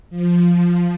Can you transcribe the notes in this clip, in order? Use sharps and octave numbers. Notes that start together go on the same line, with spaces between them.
F3